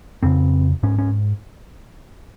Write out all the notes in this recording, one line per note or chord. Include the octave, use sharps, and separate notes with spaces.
F2 C#3 C4
G#2 C#4
C#4